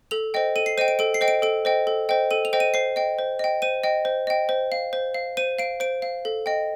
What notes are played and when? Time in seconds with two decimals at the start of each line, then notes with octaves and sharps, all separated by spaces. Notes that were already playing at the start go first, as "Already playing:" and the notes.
0.11 A4 F7
0.34 C5 D#5 G5
0.56 A4 D#7
0.66 C7
0.78 C5 D#5 G5 D#7
0.88 D7
0.99 A4 D7
1.14 C7
1.21 C5 D#5 G5
1.28 D7
1.42 A4 D7
1.65 C5 D#5 G5
1.87 A4
2.09 C5 D#5 G5
2.31 A4 D#7
2.45 F7
2.53 C5 D#5 G5
2.60 D#7
2.74 C5 C7
2.96 D#5 G5
3.19 C5
3.39 D#5 G5
3.62 C5 D#7
3.83 D#5 G5
4.05 C5
4.27 D#5 G5
4.49 C5
4.72 F5
4.93 C5
5.14 F5
5.37 C5 D#7
5.59 F5 D7
5.80 C5 D7
6.02 F5
6.25 A4
6.46 D#5 G5